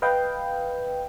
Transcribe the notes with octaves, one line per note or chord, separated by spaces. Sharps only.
B4 D#5 F5 G5